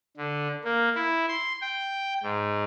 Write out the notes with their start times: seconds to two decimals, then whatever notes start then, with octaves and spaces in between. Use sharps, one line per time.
0.17 D3
0.64 A#3
0.95 E4
1.28 C6
1.61 G5
2.23 G#2